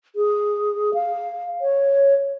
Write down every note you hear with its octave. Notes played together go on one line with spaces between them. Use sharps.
G#4
F5
C#5